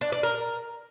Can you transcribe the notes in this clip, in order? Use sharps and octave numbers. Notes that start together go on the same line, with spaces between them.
D4
D5
A#4